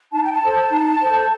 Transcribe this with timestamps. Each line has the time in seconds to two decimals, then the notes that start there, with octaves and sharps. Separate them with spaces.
0.12 D#4 A5
0.23 G5
0.31 A5
0.41 A4 C5
0.70 D#4
1.00 A4 C5